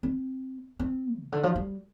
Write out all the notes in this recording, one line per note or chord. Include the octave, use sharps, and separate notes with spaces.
C4
C4
C3
D3
F3
G3